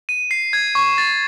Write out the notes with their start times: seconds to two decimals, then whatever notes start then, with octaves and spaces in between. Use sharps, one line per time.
0.09 D#7
0.31 C7
0.53 G#6
0.75 C#6
0.98 A6